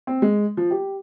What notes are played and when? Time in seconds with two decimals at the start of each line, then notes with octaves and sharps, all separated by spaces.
0.07 C4
0.22 G#3
0.57 F3
0.71 G4